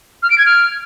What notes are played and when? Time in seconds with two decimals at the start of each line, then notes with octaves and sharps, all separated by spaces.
0.23 F6
0.30 D7
0.38 G#6
0.46 F6